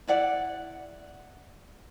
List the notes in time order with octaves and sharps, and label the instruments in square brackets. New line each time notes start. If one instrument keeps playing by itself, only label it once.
[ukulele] E4 D5 F#5